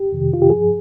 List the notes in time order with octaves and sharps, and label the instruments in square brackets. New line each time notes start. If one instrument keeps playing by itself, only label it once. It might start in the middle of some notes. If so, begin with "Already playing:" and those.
Already playing: [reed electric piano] G4
F2 C3 D#3
F4
G4
G2 F3 G#4